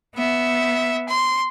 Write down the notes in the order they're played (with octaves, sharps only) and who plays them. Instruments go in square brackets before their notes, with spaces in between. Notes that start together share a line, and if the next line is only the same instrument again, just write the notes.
[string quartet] B3 E5
C6